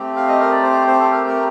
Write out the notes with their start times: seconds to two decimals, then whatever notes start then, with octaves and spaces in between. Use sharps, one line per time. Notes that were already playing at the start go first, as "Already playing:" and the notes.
Already playing: A3 C4 G4
0.16 F5
0.28 D#5
0.39 A#4
0.51 D5
0.63 C5
0.87 C5
1.00 A4
1.11 A#4
1.27 A#4